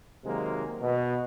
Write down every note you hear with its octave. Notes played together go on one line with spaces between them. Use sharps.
C3 D#3 F#3 G#3 A#3
B2